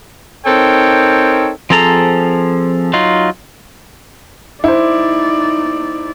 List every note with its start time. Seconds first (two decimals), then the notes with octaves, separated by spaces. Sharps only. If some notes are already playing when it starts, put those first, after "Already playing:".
0.46 C4 D#4 A4 A#4 C#5 G5
1.70 F3 C4 G#4 A4 A#5
2.93 F#3 D#4 F4
4.64 D#4 E4 C5 D5